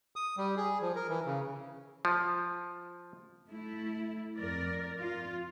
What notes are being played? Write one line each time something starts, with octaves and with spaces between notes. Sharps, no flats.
D#6
G3
G#4
F3
A#4
E3
C#3
F3
A3 E4
F2 A#4 D5
F4